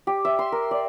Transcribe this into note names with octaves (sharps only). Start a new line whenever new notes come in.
G4
E5
C6
A#4
D5